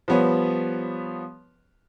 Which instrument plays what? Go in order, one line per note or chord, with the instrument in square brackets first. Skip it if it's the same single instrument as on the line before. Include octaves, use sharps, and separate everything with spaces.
[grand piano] F3 G3 B3 B4 C#5